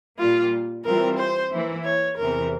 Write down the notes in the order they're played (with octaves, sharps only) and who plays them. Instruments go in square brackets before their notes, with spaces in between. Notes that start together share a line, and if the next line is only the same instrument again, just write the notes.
[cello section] A#2 G3 A#3 [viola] F4
[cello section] E3 G3 C4 F4 [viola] A#4
[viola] C5
[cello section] E3 A#3 E4
[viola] C#5
[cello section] E2 C3 E3 [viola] A#4